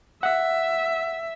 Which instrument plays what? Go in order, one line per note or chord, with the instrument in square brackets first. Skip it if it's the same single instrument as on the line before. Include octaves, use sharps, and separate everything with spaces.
[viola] E5 [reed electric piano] F#5